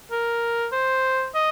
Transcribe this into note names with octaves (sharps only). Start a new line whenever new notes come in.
A#4
C5
D#5